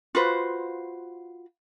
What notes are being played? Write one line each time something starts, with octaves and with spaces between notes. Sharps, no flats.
F4 F#4 B4 C5